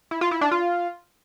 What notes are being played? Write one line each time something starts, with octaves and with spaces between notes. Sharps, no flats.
E4
F4
E4
D4
F4